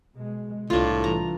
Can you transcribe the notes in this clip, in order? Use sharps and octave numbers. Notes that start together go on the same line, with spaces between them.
B2 G#3
C2 A2 D4 F4
E3 A#5